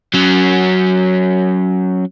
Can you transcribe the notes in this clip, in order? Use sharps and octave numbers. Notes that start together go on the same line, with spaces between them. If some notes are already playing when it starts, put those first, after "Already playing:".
F#3 C#4